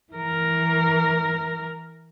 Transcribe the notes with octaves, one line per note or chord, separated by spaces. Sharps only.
E3 A#4